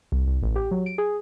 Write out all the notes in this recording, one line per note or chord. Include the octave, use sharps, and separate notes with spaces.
C2
C2
A1
G4
F#3
D7
G#4